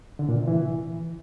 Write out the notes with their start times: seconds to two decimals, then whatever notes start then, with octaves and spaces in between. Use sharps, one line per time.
0.19 D3
0.29 A#2
0.38 C3
0.48 E3